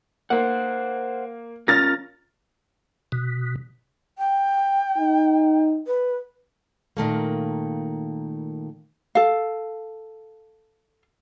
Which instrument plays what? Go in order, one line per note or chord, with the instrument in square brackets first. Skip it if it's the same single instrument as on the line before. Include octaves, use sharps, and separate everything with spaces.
[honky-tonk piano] A#3 [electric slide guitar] C5 F#5
[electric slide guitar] C#4 F4 A#4 [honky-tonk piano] F6 A6 A#6
[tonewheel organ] B2
[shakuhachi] G5
[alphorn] D#4
[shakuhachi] B4
[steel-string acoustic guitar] A#2 D#3 A3 A#3
[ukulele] A4 F5